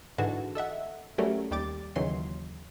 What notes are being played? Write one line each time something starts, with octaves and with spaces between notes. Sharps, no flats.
G#2 D3 E3 F#4 G#4 A5
A4 D#5 E5 F#5
F#3 G3 A3 C#4 A#4
D#2 G3 G4 D6 A6
D#2 C#3 E3 F#3 C6 C7